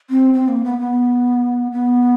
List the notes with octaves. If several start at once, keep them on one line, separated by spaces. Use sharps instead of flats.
C4
C4
A#3
B3
B3
B3